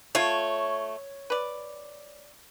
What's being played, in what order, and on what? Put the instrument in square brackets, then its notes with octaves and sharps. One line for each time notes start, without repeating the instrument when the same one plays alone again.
[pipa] A3 F4 [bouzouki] C#5
[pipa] B4 D5